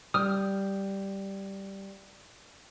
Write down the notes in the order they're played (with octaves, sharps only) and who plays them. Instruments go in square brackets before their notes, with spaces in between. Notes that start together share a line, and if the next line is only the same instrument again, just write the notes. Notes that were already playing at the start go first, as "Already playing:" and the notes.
[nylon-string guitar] G3 [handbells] D#6 F6